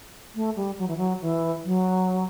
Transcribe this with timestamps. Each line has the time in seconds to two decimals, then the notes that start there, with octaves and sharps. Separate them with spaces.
0.35 A3
0.56 G3
0.78 F#3
0.88 E3
0.97 F#3
1.21 E3
1.64 F#3